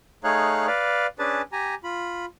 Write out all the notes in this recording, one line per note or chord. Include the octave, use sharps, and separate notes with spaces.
A3 D#4 G#4 C#5 F5 F#6
B4 D5 F5
C#4 D4 G#4 B4 A5
G4 G#5 A#5
F4 B5